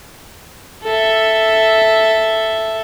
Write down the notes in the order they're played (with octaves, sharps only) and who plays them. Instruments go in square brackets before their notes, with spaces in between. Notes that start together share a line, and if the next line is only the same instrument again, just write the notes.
[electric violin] A4 E5